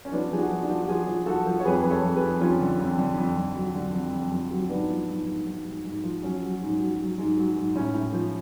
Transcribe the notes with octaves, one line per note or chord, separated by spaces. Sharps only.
C#4
F3 B3 D4
F3 G#4
D4 F#4
F3
D4 F#4
F3
F#4
F3 F4 G#4
F3
F3 F#4 A4
F3
C#5
F2 G#4 B4
F2 B4
A4 C#5
F2
G#4 B4
F2
F2 C#4 F4
D3
F2
D3
F2
F2
F#3
D3
F2
F2
F2
F#3
G#2 B3 D4
F3
G#2
G#2
G#2
G#2
G#2
F3
F#3 C#4
F#3
G#2
F#3
F#3
G#2
F#3
G#2
A2 C#4
A2
F3